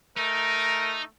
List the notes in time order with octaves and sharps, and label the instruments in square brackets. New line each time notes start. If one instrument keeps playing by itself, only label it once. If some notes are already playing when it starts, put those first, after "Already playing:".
[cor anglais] A3 [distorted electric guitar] D#4 [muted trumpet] A#4